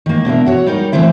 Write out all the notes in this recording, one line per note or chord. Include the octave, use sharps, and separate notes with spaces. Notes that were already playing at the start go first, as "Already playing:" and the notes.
D#3 A#3
B2 D4 A#4 E5
F#4 C#5
G3 D#4 G4 A#4
D3 E3 G#3 A3 C4 E4